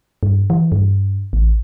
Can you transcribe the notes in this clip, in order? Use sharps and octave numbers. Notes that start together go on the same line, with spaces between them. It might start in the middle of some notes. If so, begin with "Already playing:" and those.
G2
E3
G2
A1